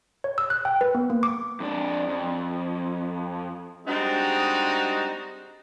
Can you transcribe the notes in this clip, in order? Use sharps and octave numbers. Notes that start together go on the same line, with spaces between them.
C#5
E6
F#6
G5
B4
B3
A#3
D6
F2 D4
F2
G3 G#3 C4 D4 D#4 F#4